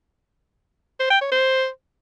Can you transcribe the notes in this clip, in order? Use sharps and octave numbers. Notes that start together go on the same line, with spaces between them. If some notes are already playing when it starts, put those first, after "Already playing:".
C5
G5
C#5
C5